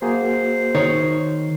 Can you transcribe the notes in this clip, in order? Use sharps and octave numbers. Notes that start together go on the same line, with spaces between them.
A#3 F#4 G#4 C5
D#3 C#5